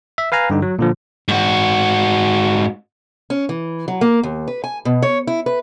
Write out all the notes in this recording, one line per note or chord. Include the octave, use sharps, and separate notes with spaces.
E5
B4 F5 G#5 A#5
G2 D3 D#4
F#3
A#2 D3 F3
G#2 F#4
C#4
E3
F#3
A#3
D#2
B4
G#5
B2
C#5
E4
B4